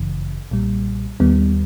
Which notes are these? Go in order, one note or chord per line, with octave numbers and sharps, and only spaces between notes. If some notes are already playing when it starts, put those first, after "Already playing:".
Already playing: G1 F#2 C#3 E3
B1 A#2 G3
D#2 D#3 G3 B3